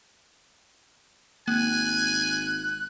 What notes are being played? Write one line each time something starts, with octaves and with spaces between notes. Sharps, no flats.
G#1 A#3 G#5 F#6